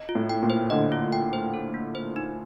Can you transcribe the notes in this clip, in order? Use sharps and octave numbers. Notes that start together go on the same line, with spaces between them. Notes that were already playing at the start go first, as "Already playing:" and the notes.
Already playing: D#5
F4
A2
G5
A#2
C5
D3 D#5
F4
G5
C5
A4
A#3
C5
D#4